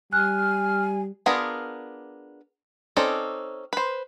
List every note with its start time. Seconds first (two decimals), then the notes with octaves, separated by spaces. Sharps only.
0.13 G3 G#5 F6 F#6
1.26 B3 D4 F4 G#4 A#4
2.97 C4 C#4 D#4 A4 D5
3.73 B4 C5